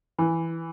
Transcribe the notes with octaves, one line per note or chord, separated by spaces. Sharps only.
E3